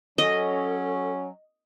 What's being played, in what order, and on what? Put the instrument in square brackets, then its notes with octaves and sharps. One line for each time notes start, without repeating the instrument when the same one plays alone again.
[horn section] F#3 C#4 [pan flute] A4 [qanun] D#5